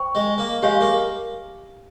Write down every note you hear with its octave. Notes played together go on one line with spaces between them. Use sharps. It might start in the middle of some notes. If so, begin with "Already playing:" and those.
Already playing: C5 G5 C#6
G#3
A#3
G#3 G4 C#5 F5 G#5
A#3